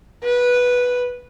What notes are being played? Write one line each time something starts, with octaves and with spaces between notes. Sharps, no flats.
B4